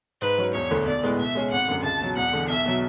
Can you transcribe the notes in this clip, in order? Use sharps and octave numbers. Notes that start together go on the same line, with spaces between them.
G#2 B4
F#3 C#4
E1 C#5
D2 D3
B1 D5
A2 G#3 B3
B2 E5
G#3 C#4 G#4
G#1 F#5
F#2 D3
C#2 A5
B2 F#3
E1 F#5
E2 D3
B1 E5
B2 F#3